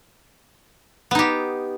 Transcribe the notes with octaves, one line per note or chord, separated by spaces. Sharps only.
B3 D#4 G4